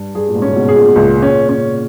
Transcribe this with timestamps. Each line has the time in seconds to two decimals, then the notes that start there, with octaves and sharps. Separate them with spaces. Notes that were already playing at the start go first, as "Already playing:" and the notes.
Already playing: G2
0.15 G2 G#4
0.29 A#2
0.35 G#2
0.42 C#4
0.49 C#3
0.55 G#2 B2
0.68 G#4
0.75 A#2 C#3
0.87 B2
0.96 C#2 A#2 C#3
1.22 C#4
1.49 C#4